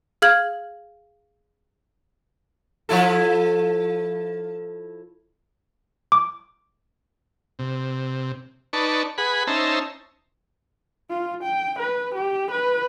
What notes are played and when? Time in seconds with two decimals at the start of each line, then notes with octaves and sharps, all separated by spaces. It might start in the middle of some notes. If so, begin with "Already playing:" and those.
0.22 G#4 F5 F6 G#6 F#7
2.89 F3 E4 A4
6.12 D6
7.59 C3
8.73 D#4 B4 D5 A5 C#6
9.18 G#4 B4 F#5 B5
9.47 C#4 D#4 C5 E5 A5 A#5
11.10 F4
11.43 G5
11.79 B4
12.15 G4
12.51 B4